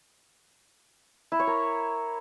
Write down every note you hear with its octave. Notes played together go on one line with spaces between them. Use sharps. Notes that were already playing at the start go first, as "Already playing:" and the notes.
E4
C#5
A#4